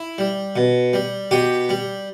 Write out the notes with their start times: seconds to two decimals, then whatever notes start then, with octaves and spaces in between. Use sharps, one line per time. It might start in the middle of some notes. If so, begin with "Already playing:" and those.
Already playing: E4
0.18 G3
0.56 B2
0.93 G3
1.31 B2 G4
1.69 G3